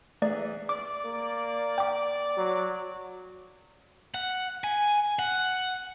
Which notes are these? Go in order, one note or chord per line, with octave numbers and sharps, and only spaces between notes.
E3 A3 G#4 D5
D5 D6
A#3
G5 D6
F#3
F#5
G#5
F#5